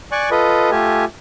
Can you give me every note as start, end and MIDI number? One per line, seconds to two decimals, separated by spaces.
0.12 0.30 74
0.12 0.30 80
0.12 0.30 85
0.12 0.30 90
0.31 0.71 65
0.31 0.71 69
0.31 0.71 71
0.31 0.71 75
0.72 1.05 57
0.72 1.05 65
0.72 1.05 67
0.72 1.05 80